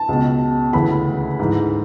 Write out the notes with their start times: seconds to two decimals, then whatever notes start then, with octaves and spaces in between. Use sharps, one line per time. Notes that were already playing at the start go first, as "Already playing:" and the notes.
Already playing: A5
0.09 C#2 B2
0.73 D2 C#3 E3 B5
1.39 G#2 E3